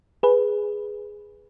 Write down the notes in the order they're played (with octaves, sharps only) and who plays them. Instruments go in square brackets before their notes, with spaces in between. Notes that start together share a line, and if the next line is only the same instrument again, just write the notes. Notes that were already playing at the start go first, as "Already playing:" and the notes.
[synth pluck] G#4 B4